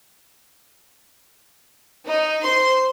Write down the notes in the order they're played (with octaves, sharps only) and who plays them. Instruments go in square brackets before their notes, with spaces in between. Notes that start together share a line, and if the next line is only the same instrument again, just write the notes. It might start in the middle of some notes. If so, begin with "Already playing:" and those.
[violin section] D#4
C5 C6